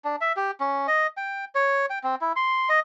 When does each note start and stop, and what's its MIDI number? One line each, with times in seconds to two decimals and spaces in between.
0.05 0.16 62
0.21 0.32 76
0.36 0.51 67
0.60 0.87 61
0.88 1.07 75
1.17 1.45 79
1.55 1.86 73
1.90 1.99 79
2.04 2.15 60
2.21 2.32 64
2.36 2.69 84
2.69 2.80 75